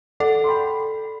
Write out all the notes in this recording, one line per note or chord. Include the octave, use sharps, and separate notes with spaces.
A4 D5 F#5
C6
G5 B5